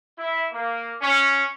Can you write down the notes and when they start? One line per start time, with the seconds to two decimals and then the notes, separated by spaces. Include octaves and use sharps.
0.18 E4
0.52 A#3
1.02 C#4